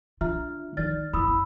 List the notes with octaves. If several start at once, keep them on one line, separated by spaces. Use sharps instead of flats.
D3 F4 E5 F6
D#3 D#4 D5 F6 A6
F#1 E4 B5 D#6 E6